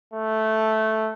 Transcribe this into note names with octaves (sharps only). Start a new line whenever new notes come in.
A3